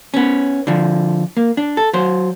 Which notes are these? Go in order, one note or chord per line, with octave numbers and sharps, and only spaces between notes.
B3 C#4
D3 F3
A#3
D4
A4
F#3 C5